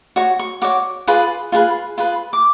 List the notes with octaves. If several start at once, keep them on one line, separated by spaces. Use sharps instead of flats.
F#4 C#5 C#6
C#6
F#4 C#5 D6
F4 G#4 B4
F4 G#4 B4
F4 G#4 B4
D6